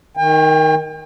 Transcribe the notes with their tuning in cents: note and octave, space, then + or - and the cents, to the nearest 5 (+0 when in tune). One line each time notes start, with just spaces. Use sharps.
D#3 +0 G5 +40